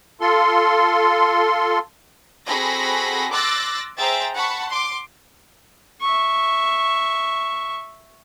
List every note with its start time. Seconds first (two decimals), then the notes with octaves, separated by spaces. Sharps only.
0.21 F4 A4 C6
2.46 C4 F#4 G#4 A4 B5 A#6
3.32 C6 D6 E6 F#6 A6 A#6
3.98 G#4 C5 E5 G5 A#5 A6
4.34 F#5 A5 B5 C#6
4.67 C6 D6
6.01 E5 C#6